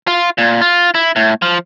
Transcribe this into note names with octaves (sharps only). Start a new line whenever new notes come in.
F4
A#2
F4
E4
A2
F3